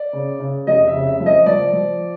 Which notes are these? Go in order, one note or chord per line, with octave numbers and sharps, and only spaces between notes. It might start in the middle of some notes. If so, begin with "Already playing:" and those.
Already playing: D5
C#3
C#3
F1 D#5
E5
C#3
E5
F3
D#5
F3 D5
F3